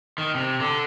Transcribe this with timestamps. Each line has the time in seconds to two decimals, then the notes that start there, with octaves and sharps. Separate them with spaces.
0.18 D#3
0.35 C3
0.60 D3